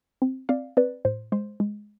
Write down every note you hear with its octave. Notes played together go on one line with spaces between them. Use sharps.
C4
C4 D5 F5
C4 B4 D5
A2 C5
G#3 C5
G#3